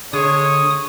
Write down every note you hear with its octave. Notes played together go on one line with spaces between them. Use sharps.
D3 G#3 C#5 D#6